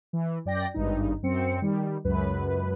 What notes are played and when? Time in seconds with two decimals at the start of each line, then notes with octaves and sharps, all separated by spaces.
0.13 E3
0.45 F#2 D5 G5 A#6
0.74 G#1 G2 D#4
1.23 F#2 C4 C#7
1.62 D#3 G3
2.04 C#2 F#2 B4